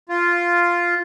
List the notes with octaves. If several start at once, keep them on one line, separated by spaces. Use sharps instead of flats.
F4